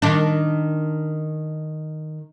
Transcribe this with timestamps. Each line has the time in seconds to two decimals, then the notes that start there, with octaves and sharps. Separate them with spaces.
0.02 D#3 D4